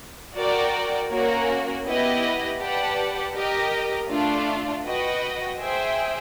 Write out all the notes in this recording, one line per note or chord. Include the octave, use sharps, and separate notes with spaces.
F#4 A#4 D5 G5
A#3 C#4 F#4 A#4
B3 E4 G4 B4 D#5
G4 B4 D5 F#5 A5
G4 A#4 D#5
A3 D4 F4
F#4 B4 D#5 G5
G#4 C5 E5 G5